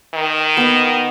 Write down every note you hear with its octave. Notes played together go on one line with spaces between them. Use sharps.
D#3
B3 A#4